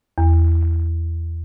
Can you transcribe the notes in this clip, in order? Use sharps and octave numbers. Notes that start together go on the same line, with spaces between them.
E2